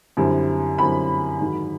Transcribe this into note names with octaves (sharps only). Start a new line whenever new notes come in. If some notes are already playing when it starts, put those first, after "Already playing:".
F#2 D3 G3 C4 E4
F#2 D3 G3 C4 E4 B5
G#2 D#3 F#3